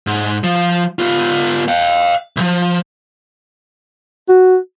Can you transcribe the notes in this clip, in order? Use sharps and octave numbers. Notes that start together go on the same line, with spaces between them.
G#2
F3
B3 F4
F5 G5
C2 F3
F#4